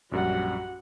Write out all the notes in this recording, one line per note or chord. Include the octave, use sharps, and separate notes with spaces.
A#1 F#2 G3 F#4 F#5